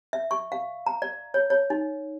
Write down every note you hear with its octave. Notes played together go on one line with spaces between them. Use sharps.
E5
C#6
F5
A#5
D5
C#5
C#5
D#4